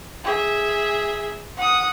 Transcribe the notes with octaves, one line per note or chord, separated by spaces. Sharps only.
G#4 E5
F#5 D#6